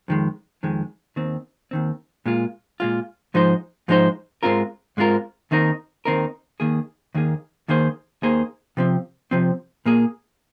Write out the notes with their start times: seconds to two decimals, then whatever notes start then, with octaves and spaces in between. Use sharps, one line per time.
0.08 F2 D#3 G#3
0.63 F2 D#3 G#3
1.16 D#2 D#3 C4
1.71 D#2 D#3 C4
2.26 A#2 G#3 F4
2.80 A#2 G#3 F4
3.34 G#2 F3 G#3 D#4 C5
3.88 G#2 F3 G#3 D#4 C5
4.43 G#2 G#3 C4 F4 A#4
4.97 G#2 G#3 C4 F4 A#4
5.51 D#2 D#3 C4 D#4 A#4
6.05 D#2 D#3 C4 D#4 A#4
6.60 D#2 D#3 A#3 G#4
7.15 D#2 D#3 A#3 G#4
7.68 D#2 D#3 A#3 G#4 C5
8.22 D#2 D#3 A#3 G#4 C5
8.77 C3 F3 C4
9.31 C3 F3 C4
9.85 A#2 A#3 G#4